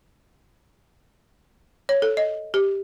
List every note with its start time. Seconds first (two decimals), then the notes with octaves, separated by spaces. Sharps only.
1.89 C#5
2.02 A4
2.17 D#5
2.54 G4